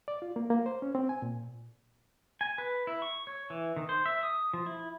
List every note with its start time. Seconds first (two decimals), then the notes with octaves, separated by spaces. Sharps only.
0.08 D5
0.22 F4
0.36 A#3
0.50 A#3
0.66 C5
0.82 C#4
0.95 C4
1.09 G#5
1.22 A#2
2.41 G#5
2.58 B4
2.87 E4
3.02 C#6
3.27 C#5
3.50 E3
3.76 D#3
3.89 C5
4.06 E5
4.23 D#6
4.54 F3
4.66 E4